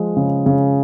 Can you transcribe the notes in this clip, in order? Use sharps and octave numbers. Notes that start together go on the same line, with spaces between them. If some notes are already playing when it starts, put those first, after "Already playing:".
Already playing: F3 G#3
C#3
C#3